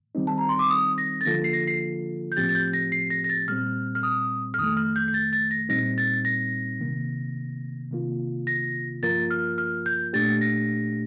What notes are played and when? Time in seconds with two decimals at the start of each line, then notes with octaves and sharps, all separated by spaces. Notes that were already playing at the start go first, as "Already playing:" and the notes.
0.15 D#3 G3 C4 D#4
0.27 A5
0.38 A#5
0.49 C6
0.59 D6
0.70 D#6
0.98 A#6
1.21 A6
1.25 D3 F3 A#3 F4 A4 A#6
1.44 C7
1.53 A#6
1.67 C7
2.32 G6
2.37 A2 F3 C4 G4 A6
2.49 A6
2.55 G6
2.73 A#6
2.92 C7
3.10 A#6
3.24 A#6
3.29 A6
3.48 A#2 G3 C4 F6
3.95 F6
4.03 D#6
4.54 F6
4.59 F2 D#3 A3 D#6
4.77 F6
4.96 G6
5.08 G6
5.14 A6
5.33 A6
5.51 A#6
5.69 A#2 G3 C4 D#4 A#6
5.98 A6
6.25 A#6
6.81 C3 D#3 A#3
7.91 C3 D#3 A#3 F4
8.47 A#6
9.03 G2 F3 A#3 F4 A#4 A6
9.31 F6
9.58 F6
9.86 G6
10.13 A#2 A3 D4 G4 A6
10.41 A#6